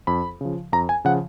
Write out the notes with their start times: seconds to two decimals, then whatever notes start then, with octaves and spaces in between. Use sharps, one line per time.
0.07 F2 B5
0.41 C#3 F3
0.72 F2 A#5
0.89 G#5
1.05 C#3 F3 F#5